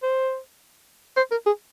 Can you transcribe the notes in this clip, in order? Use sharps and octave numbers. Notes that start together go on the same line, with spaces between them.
C5
C5
A#4
G#4